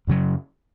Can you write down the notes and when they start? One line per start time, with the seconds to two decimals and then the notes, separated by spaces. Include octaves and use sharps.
0.07 F#2 C#3 F#3